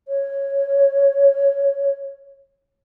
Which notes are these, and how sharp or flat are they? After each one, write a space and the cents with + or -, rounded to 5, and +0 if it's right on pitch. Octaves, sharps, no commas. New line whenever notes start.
C#5 -5